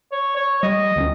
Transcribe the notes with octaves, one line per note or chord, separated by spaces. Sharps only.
C#5
C#5
G3 D#5
D2 G#3 C#4